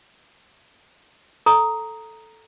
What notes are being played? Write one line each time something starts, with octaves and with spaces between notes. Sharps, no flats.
A4 A#5 D#6